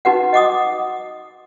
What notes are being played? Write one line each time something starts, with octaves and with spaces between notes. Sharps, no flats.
D#4 F#4 B4 F#5
D#5 F#5 D6 D#6